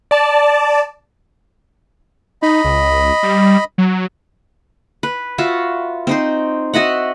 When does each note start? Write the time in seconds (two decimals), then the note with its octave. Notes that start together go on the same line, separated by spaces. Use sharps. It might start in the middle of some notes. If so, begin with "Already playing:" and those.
0.11 D5 A5
2.42 D#4 D#5 B5
2.65 C#2
3.23 G3
3.78 F#3
5.03 B4
5.38 F4 F#4 E5
6.07 C4 D#4 C5
6.74 F#4 D#5 E5 F#5